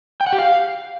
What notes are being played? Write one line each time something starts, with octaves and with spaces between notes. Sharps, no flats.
G5
F#5
G4
F5